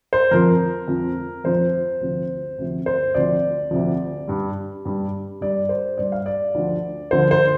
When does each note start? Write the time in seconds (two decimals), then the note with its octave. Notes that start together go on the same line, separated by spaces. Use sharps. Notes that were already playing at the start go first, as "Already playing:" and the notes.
0.13 C5
0.31 F2 F3 A#4
0.88 F2 F3
1.44 F2 F3 C5
2.01 D2 C3 F3
2.58 D2 C3 F3
2.86 C5
3.15 D2 C3 F3 D5
3.71 D2 C3 F3
4.27 G2 G3
4.85 G2 G3
5.41 G2 G3 D5
5.69 C5
5.98 G2 G3 D5
6.12 F5
6.26 D5
6.54 D2 D3 F3
7.11 D2 D3 F3 C5
7.31 C5